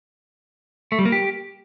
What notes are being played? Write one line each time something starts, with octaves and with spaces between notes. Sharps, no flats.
A3
G3
A#3
G4